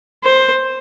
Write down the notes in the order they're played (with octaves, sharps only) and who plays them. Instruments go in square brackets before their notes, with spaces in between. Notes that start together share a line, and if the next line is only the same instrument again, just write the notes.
[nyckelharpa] C5